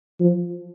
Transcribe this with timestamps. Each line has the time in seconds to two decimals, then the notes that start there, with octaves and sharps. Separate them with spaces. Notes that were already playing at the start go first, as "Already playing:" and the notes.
0.20 F3